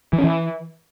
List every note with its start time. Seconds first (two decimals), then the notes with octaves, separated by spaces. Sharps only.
0.13 E3
0.18 C#4
0.24 E3